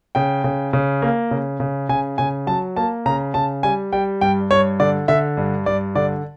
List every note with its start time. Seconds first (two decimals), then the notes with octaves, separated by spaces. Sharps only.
0.15 C#3 G5
0.44 C#3
0.73 C#3
1.02 A#3
1.31 C#3
1.60 C#3
1.89 C#3 G#5
2.18 C#3 G#5
2.47 F#3 A5
2.76 A#3 A5
3.06 C#3 A#5
3.34 C#3 A5
3.63 G3 G#5
3.93 G3 G5
4.21 G2 G5
4.51 G2 C#5
4.80 D3 D5
5.08 D3 E5
5.37 G2
5.66 G2 D5
5.95 D3 D5